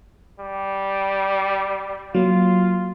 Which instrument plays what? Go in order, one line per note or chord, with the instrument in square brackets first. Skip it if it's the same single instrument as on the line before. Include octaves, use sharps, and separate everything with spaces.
[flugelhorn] G3
[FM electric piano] F#3 A#3 [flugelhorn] F4